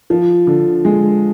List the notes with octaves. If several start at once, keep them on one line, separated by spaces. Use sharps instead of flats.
F3
D3
G#3